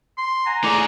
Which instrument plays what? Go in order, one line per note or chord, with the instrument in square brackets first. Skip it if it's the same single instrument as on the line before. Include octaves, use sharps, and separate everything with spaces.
[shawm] C6
[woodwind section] F#5 G#5 A#5
[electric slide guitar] A2 G#4 [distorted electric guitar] D#4 C#5 [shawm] D5